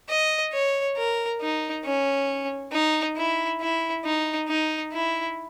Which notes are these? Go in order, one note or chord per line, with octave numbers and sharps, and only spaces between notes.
D#5
C#5
A#4
D#4
C#4
D#4
E4
E4
D#4
D#4
E4